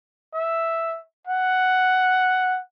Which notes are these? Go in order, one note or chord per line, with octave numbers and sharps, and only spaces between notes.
E5
F#5